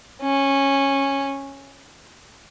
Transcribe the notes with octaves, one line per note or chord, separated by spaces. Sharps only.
C#4